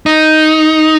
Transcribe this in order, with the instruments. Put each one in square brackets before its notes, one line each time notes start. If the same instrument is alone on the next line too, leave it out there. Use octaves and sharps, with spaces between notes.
[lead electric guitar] D#4